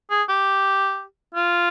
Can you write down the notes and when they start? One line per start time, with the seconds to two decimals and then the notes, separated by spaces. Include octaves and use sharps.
0.11 G#4
0.29 G4
1.35 F4